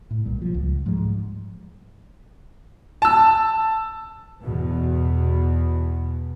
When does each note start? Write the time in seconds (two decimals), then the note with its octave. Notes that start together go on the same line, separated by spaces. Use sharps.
0.11 A2
0.26 B1 A#2 G3
0.42 F3
0.54 C#2
0.86 G#2 F3 G3 G#3
3.02 A5 E6
4.41 E2 B2